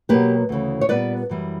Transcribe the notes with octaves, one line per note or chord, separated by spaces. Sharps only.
B2 F#3 A#3 G4 B4
D2 C#3 E3
C#5
A#2 G3 B3 B4 D5
F#2 E3 G3